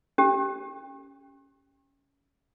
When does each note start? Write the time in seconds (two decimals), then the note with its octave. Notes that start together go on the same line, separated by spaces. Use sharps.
0.18 C#4 G4